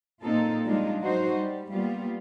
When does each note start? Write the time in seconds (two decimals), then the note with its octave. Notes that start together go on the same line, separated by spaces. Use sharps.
0.23 A#2 A#3 C4 D#4 F4 A4
0.66 F3 G3 G#3 D4 D#4 F4
1.00 F#3 D#4 F#4 C5
1.34 G3
1.72 G3 A#3 B3 F4